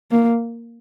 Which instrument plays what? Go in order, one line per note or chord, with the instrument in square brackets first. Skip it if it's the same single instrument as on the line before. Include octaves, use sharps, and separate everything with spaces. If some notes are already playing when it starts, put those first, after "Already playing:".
[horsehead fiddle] A#3